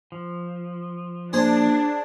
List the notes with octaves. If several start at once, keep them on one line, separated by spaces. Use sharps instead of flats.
F3
A#2 D4 G#4 C5